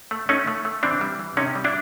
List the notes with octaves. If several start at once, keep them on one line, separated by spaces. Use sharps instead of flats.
A3
A3 C#4 D#4
A3
A3
E3 C4 D4
G3
E3
C3 C#4 D#4
G3
D4 E4